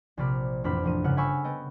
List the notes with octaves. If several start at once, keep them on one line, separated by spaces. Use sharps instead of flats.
A#1 C3 D5 B5 F6
A1 F2 C4 D4 B5 F6
A1 F3 D#7
G1 C#3 F#5 F6
G5 G#5 B5 C#6 E6 F6
B3 D#5 G5